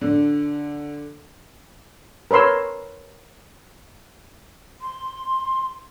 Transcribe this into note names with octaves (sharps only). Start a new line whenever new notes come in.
D3
A#4 B4 C#5 C6 E6
C6